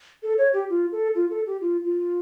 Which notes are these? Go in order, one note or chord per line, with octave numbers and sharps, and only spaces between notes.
A4
C#5
G4
F4
A4
F4
A4
G4
F4
F4